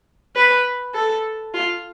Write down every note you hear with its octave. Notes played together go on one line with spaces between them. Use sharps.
B4
A4
F4